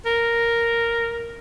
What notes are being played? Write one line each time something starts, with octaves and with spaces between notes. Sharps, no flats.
A#4